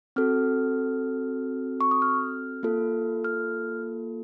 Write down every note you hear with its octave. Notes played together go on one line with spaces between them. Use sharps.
C4 F#4 A4 F6
C#6
D#6
F6
A#3 F4 A4
F6